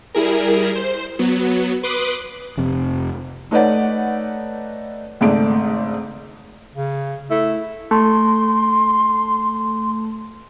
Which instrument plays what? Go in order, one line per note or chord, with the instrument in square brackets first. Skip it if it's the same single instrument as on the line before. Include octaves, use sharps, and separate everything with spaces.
[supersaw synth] G3 E4 G#4 A#4
C5
F#3 B3
B4 C6 D6 D#6 F#6
[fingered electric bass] F1 F2 C3
[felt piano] A3 D#4 B4 C#5 D5 F#5
G#1 G#2 C#3 A3 D5 D7
[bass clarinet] C#3
[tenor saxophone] A3 [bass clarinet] E4
[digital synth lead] A3 [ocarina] C6